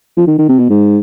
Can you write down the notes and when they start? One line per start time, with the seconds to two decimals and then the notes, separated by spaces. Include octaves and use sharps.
0.17 F3
0.27 D#3
0.38 D#3
0.49 C3
0.59 B2
0.69 G#2